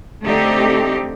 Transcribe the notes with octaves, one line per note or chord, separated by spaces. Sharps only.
D3 A3 C4 D#4 G4